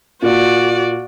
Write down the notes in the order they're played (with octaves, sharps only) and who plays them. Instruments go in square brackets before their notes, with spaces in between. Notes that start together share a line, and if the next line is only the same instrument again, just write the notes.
[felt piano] A#2 [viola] F#4 D5